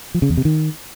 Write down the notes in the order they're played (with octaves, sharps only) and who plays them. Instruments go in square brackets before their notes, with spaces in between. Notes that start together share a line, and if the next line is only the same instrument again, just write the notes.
[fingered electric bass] F3
C#3
E2
C3
D#3